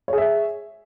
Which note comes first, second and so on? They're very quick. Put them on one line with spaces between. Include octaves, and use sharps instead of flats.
C#5 G#4 E5